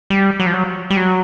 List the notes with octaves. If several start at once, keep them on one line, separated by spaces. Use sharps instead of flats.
G3
F#3
F3
F#3
G3
F#3